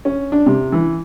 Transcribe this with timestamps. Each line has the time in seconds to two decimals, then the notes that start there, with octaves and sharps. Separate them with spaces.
0.05 C#4
0.32 D4
0.46 C3
0.72 E3